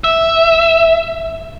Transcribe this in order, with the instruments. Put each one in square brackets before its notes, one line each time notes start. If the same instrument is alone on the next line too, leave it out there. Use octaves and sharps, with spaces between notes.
[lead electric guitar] E5